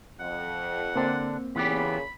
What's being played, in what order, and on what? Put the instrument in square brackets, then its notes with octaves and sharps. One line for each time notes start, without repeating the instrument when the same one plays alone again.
[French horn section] F2 [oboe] F#5
[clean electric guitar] D3 D4 [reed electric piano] A#3 C4
[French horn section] A#2 C#3 [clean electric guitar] E3 B3 G4 [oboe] B5